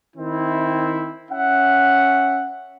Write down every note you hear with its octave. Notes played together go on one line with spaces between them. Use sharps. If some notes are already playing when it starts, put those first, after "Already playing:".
D#3 C4 E4
C#4 E5 F#5